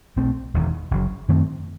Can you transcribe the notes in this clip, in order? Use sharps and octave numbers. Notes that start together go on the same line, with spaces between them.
B1 B2 A3 C4
E1 E2 D#3
F#1 F#2 F#3
F#2 D#3 A3 C4